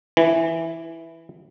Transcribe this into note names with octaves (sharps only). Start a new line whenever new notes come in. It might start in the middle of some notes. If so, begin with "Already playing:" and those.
E3